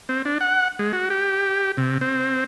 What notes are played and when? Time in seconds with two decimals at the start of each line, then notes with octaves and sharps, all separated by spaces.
0.09 C4
0.25 D4
0.41 F#5
0.79 G#3
0.93 F#4
1.10 G4
1.77 C3
2.01 C4